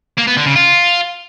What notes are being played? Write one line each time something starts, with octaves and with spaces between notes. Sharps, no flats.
A#3
B3
D3
C#3
F4